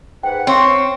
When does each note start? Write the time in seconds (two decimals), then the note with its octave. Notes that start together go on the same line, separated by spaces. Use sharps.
0.23 G#2 B4 F#5 G5
0.47 C4 C#5 F5 C6 C#6